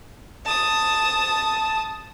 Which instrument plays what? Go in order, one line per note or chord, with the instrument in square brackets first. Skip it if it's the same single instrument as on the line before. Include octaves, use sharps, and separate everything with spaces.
[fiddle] A5 D#6